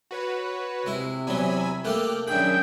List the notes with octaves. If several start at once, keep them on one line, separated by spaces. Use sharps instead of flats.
F#4 B4 C#5
C3 G#3 E4
E2 F#3 G#5 B5 E6
A3 A#3 G4 G5 F6 F#6
F#2 D#3 G#3 D4 G#4 E5 G5 B5